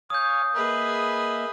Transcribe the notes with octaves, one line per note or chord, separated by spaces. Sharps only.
C#5 F5 G#5 D#6 G6
A#3 G#4 B4 D#5 E5